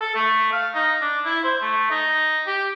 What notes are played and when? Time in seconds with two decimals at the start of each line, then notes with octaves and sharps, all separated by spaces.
0.01 A4
0.15 A3
0.52 F5
0.75 D#4
1.01 D4
1.25 E4
1.44 C5
1.62 A3
1.91 D#4
2.47 G4